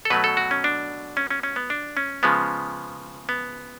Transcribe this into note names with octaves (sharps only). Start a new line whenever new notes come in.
A4
B2 F#3 A3 B4
A4
F#4
C#4
D4
C#4
C#4
C#4
B3
D4
C#4
C#3 F3 G#3 B3
B3